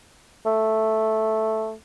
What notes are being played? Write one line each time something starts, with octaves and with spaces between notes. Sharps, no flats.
A3